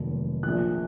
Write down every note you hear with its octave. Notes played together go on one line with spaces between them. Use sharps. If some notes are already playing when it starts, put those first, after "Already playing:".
Already playing: F1 D#2 D#3 F#3
A#1 A#2 F3 F#6